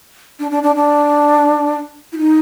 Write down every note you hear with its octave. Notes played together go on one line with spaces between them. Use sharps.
D4
D4
D4
D4
E4
D#4